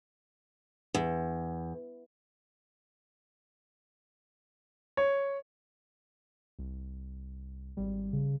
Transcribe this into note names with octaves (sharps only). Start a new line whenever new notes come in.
E2
C#5
C2
G#1 G3
C#3